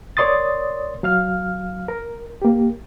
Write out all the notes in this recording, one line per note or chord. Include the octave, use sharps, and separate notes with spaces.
A#4 C#5 D5 C6 D#6 A6
F#3 F5 F6
A#4
A#3 G4